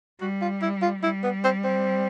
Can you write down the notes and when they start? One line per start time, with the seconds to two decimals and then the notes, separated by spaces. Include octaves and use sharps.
0.21 G3 F#4
0.42 F4
0.62 E4
0.82 F4
1.03 G3 E4
1.24 B3
1.44 C4
1.64 C4